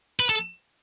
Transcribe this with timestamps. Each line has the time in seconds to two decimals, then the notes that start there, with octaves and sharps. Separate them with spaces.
0.20 B4
0.29 A4